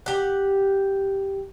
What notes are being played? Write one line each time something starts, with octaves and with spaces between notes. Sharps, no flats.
G4 F#5